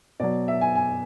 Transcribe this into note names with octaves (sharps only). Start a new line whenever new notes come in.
B2 F#3 D5
E5
G#5
G#5